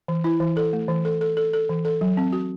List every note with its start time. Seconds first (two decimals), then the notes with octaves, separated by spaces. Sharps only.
0.08 E3
0.24 E4
0.40 E3
0.57 A4
0.73 A3
0.88 E3
1.05 A4
1.21 A4
1.37 A4
1.53 A4
1.69 E3
1.85 A4
2.01 F#3
2.17 C4
2.32 F#4